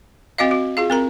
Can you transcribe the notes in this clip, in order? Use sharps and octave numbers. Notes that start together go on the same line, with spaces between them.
C4 F#4 D#5 F5
F#4
F4 G#4 F5
C4 A#4 A#5